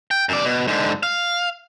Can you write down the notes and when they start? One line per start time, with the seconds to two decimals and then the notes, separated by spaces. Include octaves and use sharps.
0.11 G5
0.29 F#2 D5
0.45 B2
0.68 G#2 D3
1.03 F5